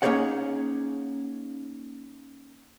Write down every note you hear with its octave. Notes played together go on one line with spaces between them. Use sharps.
A#3 C#4 D#4 G#4 C#5 F#5